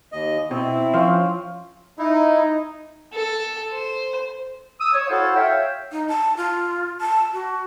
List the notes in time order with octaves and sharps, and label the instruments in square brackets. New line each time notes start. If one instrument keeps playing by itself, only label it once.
[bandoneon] D#2 D#5
[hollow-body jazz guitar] B2 [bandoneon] C4 [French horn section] E4
[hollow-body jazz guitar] F3 [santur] C#4 C5 F5
[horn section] D#4 [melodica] E4
[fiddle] A4
C5
[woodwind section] D#6 E6
C#5
E4 F#4 A4 C5 F5 F#5
C#5 E5 F5 G5
[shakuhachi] D#4
A5
F4
A5
F#4